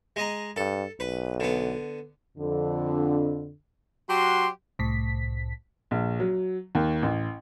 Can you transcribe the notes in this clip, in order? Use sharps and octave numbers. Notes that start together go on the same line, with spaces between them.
G#3 D#5 A#5
G2 A4
B1 B4
D3 B3
F2 D3
F#3 F#4 G4 C6
C2 A2 B6
A#1
F#3
D#2
A1